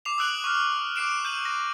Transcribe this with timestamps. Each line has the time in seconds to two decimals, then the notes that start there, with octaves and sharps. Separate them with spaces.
0.05 D6 C7 F7
0.18 D#6 E6 F#6 D7 F#7
0.44 C#6 F6
0.96 D6 F6 C7 D7 E7
1.25 G6 D#7 F#7
1.45 A#6